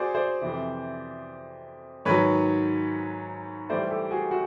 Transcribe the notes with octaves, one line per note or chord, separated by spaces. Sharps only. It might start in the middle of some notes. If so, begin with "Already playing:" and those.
Already playing: F#4 G#4 C5 D5
C5 D5
F2 C3 E3
G#2 D#3 F#3 B4 C#5
A2 E3 G3 C5 D5
G4 A4
F#4 G#4
F#4